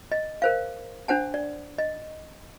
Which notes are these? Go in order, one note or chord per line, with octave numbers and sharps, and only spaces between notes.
D#5
A#4 C5 F5
D4 C5 F#5 A5
D5
D#5